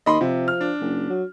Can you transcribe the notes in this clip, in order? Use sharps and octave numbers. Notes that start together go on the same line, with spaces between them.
D#2 D#5 B5 C6
C3 F3
F6
D4
F#1
F#3